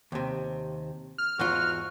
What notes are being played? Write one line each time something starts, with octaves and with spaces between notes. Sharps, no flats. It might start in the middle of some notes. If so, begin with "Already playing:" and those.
D#2 C3
F6
E2 G#2 F4 F#4